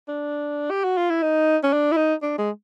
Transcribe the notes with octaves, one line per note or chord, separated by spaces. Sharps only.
D4
G4
F#4
F4
E4
D#4
C#4
D4
E4
D#4
D4
G#3